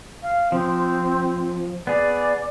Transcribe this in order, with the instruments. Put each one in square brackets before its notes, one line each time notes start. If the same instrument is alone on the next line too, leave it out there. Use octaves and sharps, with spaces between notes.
[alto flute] F5
[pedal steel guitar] F3 [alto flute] C4
[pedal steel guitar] B3 G#4 [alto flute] D5